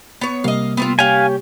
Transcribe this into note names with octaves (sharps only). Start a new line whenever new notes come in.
B3 C#5
C3 G3 A#3 D#5 F5
B3 C4 F4
C#4 G4 F5 G#5